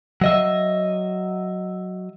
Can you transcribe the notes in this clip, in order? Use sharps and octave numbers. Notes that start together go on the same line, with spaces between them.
F#3 D#5 E5